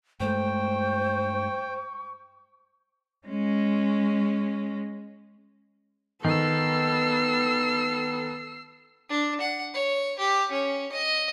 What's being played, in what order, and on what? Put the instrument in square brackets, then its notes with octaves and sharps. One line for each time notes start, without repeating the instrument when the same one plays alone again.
[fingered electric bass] G2 G#3 A3 [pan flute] C5 [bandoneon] G5 [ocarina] C#6
[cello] G#3 C#4
[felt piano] D#3 [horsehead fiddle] B3 A4 [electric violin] E6 C7
[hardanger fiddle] D4
F#5
C#5
G4
C#4
D#5